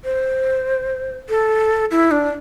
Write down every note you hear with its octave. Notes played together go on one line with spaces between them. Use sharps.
C5
A4
E4
D4